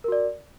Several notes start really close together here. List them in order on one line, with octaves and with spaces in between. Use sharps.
A#4 F#4 D5